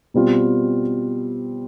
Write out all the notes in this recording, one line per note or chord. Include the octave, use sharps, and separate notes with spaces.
B2 G3 C4 F4